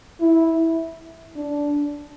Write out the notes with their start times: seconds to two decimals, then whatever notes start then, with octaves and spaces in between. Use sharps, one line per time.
0.20 E4
1.36 D4